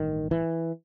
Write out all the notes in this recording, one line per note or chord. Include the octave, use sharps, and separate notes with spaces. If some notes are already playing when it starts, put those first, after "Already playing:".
Already playing: A1 G2 D#3
E3